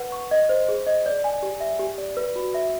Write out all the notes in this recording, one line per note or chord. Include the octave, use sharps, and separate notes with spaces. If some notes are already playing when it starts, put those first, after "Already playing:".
Already playing: B4 F#5
C#6
D#5
C5
G#4
D#5
D5
G#5
G4
E5
G4
D5
B4
F#4
E5